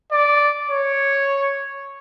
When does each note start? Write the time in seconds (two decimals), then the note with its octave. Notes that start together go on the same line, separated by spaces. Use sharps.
0.12 D5
0.70 C#5